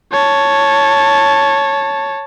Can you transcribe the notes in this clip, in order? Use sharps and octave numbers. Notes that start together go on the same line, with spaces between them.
C#5 A5